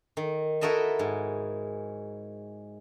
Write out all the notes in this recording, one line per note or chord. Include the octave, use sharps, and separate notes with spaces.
D#3
E4 F#4 A4 A#4 D#5 E5
G#2